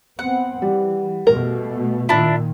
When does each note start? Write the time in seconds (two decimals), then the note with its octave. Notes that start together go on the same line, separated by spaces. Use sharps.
0.19 B3 C4 F#5
0.62 E3 G3
1.27 B2 A3 A#4
2.09 A#2 D#3 D4 E4 F4